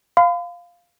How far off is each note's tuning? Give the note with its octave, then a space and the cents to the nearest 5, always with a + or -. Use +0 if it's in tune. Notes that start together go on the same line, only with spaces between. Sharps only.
F5 +0 B5 +45